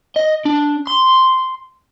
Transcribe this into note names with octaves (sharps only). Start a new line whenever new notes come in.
D#5
D4
C6